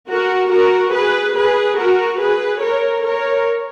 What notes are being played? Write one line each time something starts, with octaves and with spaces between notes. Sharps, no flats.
F#4 A#4
F#4 A#4
G#4 B4
G#4 B4
F#4 A#4
G#4 B4
A#4 C#5
A#4 C#5